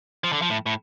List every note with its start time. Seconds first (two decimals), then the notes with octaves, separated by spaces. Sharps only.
0.24 F3
0.33 D3
0.42 F3
0.50 A2
0.66 A2